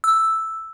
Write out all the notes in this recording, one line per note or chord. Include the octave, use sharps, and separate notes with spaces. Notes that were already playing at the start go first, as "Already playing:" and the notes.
E6